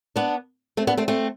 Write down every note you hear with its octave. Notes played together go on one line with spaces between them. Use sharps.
B3 D4
A3 C4
B3 D4
A3 C4
A3 C4